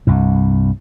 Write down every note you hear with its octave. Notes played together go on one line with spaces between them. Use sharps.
C2 G2